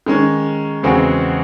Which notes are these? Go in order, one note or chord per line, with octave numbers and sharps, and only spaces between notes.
D#3 G#3 C#4
E2 C#3 G#3 C4 F#4